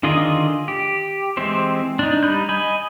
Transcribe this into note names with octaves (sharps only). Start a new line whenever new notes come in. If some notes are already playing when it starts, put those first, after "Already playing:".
D3 D#3 F4 G#4 D#5
G4
E3 G#3 C4 G4 C5
D4 D#4
G3 D#4 B5 G6
D#5 G#5 B5